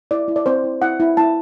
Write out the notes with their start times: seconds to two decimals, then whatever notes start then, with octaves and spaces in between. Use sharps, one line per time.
0.11 E4 D5
0.28 E4
0.36 D5
0.46 C4 C5
0.64 E4
0.82 E4 F#5
1.00 E4
1.17 E4 A5